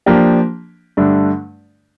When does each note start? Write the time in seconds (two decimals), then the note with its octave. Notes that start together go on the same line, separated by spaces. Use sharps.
0.06 F3 A#3 D4 G4
0.97 G2 D3 A3 D4